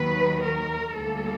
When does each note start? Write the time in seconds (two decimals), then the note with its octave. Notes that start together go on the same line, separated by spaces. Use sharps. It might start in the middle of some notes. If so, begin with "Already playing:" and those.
Already playing: D#2 D#3 F#3 B4
0.42 A#4
0.95 D2 D3 G3 A#3 A4